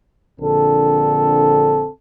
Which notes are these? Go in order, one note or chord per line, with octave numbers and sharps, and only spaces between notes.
A#1 D3 C4 A4